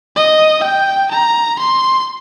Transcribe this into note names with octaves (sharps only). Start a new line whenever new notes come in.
D#5
G5
A#5
C6